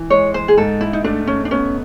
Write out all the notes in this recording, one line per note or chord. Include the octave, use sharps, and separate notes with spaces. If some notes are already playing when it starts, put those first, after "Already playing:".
Already playing: E3
G#3 C#5
C5
G#4
G#2 A4
E4
D#4
A3 D4
C#4
D4
B3 C#4